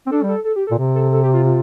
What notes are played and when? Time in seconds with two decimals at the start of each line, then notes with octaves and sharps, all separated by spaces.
0.07 C4
0.11 D4 A4
0.22 G3
0.28 A4
0.44 A4
0.56 G4
0.67 A4
0.71 A#2
0.79 C3
0.95 A4
1.12 A4
1.23 G4
1.34 F4
1.45 F4